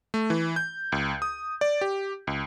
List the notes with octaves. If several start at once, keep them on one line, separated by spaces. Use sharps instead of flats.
A3
E3
G6
C#2
D#6
D5
G4
C#2